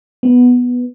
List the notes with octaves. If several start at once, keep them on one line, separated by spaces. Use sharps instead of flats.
B3